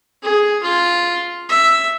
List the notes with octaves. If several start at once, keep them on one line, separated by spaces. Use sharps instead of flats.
G#4
F4
E5